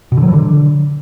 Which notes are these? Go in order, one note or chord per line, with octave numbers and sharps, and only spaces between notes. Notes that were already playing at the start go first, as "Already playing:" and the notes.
B2
D3
F#3
E3
D3